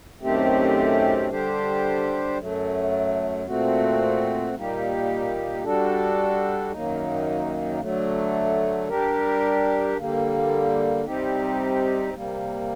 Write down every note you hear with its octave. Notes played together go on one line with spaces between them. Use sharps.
F#2 D#3 A3 C4 G4
D3 G3 D4 G4 C5
F#2 F#3 A3
A#2 A3 C4 F#4
A#2 G3 A#3 D#4 G4
G3 D4 F#4 A4
F#2 D#3 F#3 A#3 D#4
D3 F#3 A3
G3 D4 G4 A#4
D3 G3 A#3
C3 G3 C4 D#4 G4
C3 G3 A#3